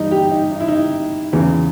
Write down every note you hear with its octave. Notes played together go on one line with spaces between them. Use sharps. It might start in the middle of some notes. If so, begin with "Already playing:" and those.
Already playing: G2 E3 D#4
G4
D#4
D#4
E4
D#4
E2 C#3 E3